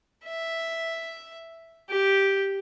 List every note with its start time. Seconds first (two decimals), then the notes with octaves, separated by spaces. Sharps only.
0.25 E5
1.90 G4